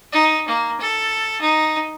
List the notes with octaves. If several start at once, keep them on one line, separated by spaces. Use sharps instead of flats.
D#4
A#3
A4
D#4